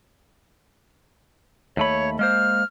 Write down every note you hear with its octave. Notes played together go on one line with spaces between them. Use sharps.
D#2 A3 C#5 B5
G#3 A#3 C5 F6